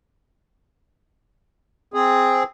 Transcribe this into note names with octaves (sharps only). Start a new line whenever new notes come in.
C4 G#4